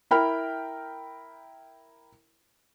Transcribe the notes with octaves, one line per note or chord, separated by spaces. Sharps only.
E4 A#4 G5 B5 F6